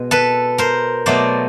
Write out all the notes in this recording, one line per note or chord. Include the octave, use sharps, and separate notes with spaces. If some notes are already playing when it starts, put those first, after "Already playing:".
Already playing: B2 G#3
A4 B4
A#4 C5
B2 F#3 A3 C5 D5